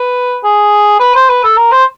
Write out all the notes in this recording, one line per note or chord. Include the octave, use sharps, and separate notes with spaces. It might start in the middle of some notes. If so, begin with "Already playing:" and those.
Already playing: B4
G#4
B4
C5
B4
A4
A#4
C5